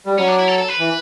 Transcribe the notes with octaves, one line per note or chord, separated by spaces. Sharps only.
G3
F#3 C#4
D4
E4
A4
A4
B4
E3